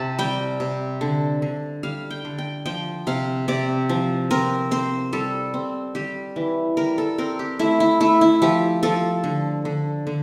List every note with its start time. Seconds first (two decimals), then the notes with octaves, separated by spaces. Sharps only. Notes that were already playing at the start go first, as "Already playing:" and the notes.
Already playing: C3 A5
0.19 G3 G5
0.60 C3
1.01 D3
1.42 D3
1.83 G3 F5
2.10 G5
2.25 D3
2.38 G5
2.66 F3 G5
3.07 C3 F5
3.48 C3 D5
3.89 F3
4.31 C4 A#4
4.71 C4 C5
5.13 G3 A4
5.54 C4
5.95 G3 G4
6.36 E3
6.77 G3 A#4
6.98 A4
7.18 C4 A#4
7.39 G4
7.59 A3 E4
7.80 E4
8.00 A3 E4
8.21 E4
8.42 F3 G4
8.83 F3 A4
9.24 D3
9.65 D3
10.07 D3